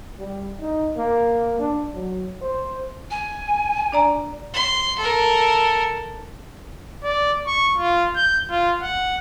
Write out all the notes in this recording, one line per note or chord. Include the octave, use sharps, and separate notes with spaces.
G3
D#4
A#3
D4
F#3
C5
G#5
D4 D5 A#5
C6
A4 A#4
D5
C#6
F4
G6
F4
F#5